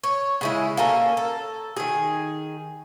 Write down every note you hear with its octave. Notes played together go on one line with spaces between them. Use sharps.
C#5
C#3 G#3 E4
A#3 C#4 A4 A#4
A4
D#3 G#4